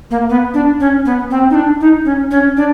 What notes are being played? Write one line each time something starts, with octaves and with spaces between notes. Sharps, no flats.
A#3
B3
D4
C#4
B3
C4
D#4
D4
D#4
C#4
C#4
D4